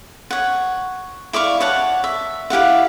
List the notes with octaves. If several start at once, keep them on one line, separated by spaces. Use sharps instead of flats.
C#5 F#5
E4 D5 F5 C#6
C#5 F#5 A5
E5
E4 G4 F5 F#5